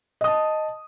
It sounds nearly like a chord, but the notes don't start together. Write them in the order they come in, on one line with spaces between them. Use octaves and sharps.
D#5 D#6 A5